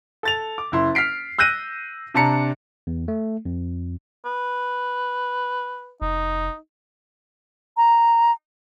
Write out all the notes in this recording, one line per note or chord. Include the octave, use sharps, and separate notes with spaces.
A4 A6 F7
D6
F#1 E4 C6
F6 B6 C7 D7
E6 F#6 G6 A#6 D#7
C3 D4 A5 A#5 C#7
E2
A3
F2
B4
F1 D#4
A#5